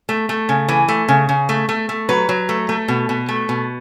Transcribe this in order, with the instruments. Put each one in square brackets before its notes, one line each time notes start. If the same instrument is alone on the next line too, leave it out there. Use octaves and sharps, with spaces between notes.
[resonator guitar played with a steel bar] A3
A3
C#3
E3
A3
C#3
C#3
A3
A3
A3
F#3 B4
F#3
A3
A3
B2
B2
A3
B2